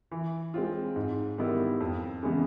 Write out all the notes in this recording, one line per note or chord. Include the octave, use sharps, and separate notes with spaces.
E3
G#3 C4 F4
G#2
D#3 G3 B3 E4
F2
C#3 E3 G#3 B3